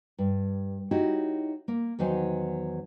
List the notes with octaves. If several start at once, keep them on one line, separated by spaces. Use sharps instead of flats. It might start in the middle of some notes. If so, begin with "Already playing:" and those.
G2
D#4 E4 F#4 G4 C#5 D#5
A#3
E2 D#3 F#3 D#4 C5 G#5